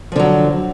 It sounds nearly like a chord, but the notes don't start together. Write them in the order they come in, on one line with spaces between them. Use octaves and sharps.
F3 D3 F#3